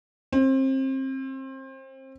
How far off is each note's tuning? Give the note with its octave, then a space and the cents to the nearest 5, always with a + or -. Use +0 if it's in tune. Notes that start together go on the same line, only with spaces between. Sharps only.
C4 +30